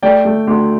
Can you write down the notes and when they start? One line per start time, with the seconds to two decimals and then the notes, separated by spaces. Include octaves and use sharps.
0.03 A3 D5 G5
0.25 A3
0.47 D2